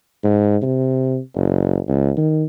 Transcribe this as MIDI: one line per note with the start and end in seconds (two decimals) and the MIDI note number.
0.24 0.57 44
0.62 1.19 48
1.35 1.79 30
1.88 2.12 37
2.18 2.45 51